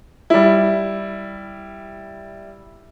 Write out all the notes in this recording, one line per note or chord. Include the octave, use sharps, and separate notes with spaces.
G3 E4